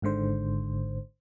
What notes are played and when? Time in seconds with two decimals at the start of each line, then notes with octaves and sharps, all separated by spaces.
0.02 G#1 G#2 D3 C5